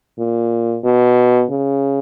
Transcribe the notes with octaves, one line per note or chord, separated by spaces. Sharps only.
A#2
B2
C#3